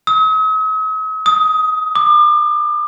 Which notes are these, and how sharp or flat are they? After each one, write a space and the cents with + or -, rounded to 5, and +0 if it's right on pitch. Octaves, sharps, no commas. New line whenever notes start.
D#6 +45
D#6 +15
D6 +35